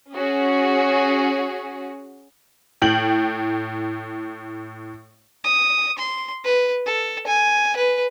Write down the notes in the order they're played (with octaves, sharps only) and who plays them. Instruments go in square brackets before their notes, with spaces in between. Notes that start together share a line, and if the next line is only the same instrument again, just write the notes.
[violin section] C#4 F#4 G#4
[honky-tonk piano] A2 G5 F#7
[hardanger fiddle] D#6
C6
B4
A4
G#5
B4